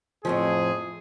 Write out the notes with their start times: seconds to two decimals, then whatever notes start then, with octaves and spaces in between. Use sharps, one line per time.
0.25 F2 A2 F3 G#4